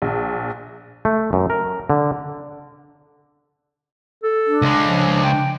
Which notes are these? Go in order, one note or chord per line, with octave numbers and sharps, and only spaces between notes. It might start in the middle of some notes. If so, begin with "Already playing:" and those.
A#1
A3
F#2
A#4
D3
A4
D4
C#2 G#3
F3
G5